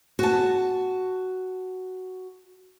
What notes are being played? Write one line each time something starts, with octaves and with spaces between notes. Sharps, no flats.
F#4 A5